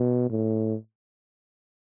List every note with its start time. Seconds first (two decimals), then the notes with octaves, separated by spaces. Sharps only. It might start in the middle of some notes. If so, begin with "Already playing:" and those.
Already playing: B2
0.30 A2